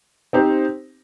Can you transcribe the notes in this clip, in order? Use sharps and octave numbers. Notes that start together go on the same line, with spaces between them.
C4 D#4 G4 C5